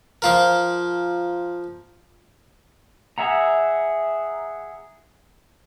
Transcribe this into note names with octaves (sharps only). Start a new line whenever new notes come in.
F3 F4 A#4
G#4 E5 F#5 A#5